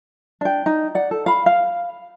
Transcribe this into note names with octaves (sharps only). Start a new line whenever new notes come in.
D4 G5
D#4
D5 F#5
A4
F5 B5
F5